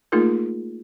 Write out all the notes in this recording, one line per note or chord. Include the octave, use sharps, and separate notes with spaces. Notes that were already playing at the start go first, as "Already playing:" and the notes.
A3 A#3 D#4 F4 G#4 A#4